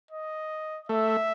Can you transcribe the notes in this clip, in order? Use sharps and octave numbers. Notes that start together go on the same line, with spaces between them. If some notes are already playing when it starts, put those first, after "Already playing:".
D#5
A3 E5